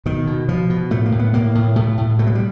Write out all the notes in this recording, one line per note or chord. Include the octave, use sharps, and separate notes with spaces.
B2 D#3
B2
B2 F3
B2
A2 A3
A#3
A2
B3
A2 A#3
A2
A2 A3
A2
B2 A3
G#3
G3